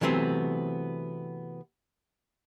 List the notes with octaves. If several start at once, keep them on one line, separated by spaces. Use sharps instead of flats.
C3 E3 F#3 A3 B3 C4